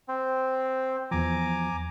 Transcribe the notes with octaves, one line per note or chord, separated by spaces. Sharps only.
C4
E2 F3 G#5 A#5 D6